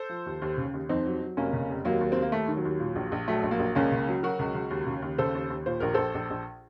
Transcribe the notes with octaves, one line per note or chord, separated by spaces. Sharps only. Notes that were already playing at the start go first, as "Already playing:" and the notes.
Already playing: A4 C5
F3
D#2
D#2
C#3
D#2
F2 C4 D#4
F#3
F#3
F1 A#3 C#4
C#3
F1
D#2 F#3 A#3
D#2
C4
D#2
A#3
D#2 A3
D#3
F#3
D#2
A#2
A#1
A#1
F#3 A3
A#1
F#3 A#3
A#1
C#2 A#3 C#4
C#3
F#3
F#3 F#4 A#4
C#2
C#2
D#2
C#3
D#2
C#3 A4 C5
D#2
D#2
A#2 C5
A#1 A#4
A#1 A4 C5
A#1
A#1